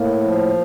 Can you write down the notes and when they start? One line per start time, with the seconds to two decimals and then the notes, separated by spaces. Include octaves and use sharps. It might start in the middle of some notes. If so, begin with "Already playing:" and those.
Already playing: A2 A#3
0.23 F3